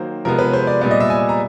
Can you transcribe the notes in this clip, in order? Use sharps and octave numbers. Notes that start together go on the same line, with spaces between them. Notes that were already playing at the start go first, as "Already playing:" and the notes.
Already playing: D#3 F#3 A#3 C5
C3 F3 G#3 B3 A#4
B4
C5
D5
A#2 G3 B3 D5
D#5
E5
G#5
A#5